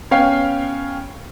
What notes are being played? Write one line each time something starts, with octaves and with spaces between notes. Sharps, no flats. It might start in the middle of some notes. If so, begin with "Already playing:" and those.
B3 C#4 C#5 F5 G5 C7